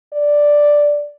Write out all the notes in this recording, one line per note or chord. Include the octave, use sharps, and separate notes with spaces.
D5